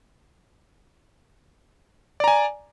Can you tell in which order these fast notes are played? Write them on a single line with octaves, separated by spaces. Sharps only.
D5 A#5 G#5